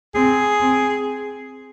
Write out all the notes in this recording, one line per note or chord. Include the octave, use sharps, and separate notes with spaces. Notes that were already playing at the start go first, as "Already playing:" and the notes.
C4 G#4
C4